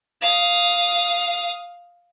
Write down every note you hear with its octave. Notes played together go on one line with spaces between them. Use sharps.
F5 D#6